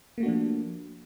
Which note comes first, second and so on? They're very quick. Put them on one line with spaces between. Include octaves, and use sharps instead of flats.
A#3 A3 F#4 D4 F3